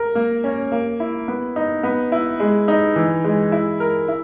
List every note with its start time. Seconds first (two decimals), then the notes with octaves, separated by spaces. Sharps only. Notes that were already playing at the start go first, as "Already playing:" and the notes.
Already playing: A#4
0.15 A#3
0.44 C#4
0.72 A#3
1.00 E4
1.28 B3
1.56 D#4
1.83 B3
2.12 E4
2.40 G#3
2.68 D#4
2.96 E3
3.24 G#3
3.52 E4
3.80 A#4
4.08 E4